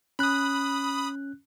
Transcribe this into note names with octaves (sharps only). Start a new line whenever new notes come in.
C#4 B5 D#6 F#6